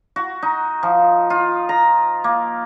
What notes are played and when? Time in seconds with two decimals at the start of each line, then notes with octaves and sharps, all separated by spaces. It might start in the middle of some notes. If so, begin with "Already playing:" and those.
0.16 F#4
0.43 D#4
0.83 F3
1.30 F4
1.69 A#5
2.24 A#3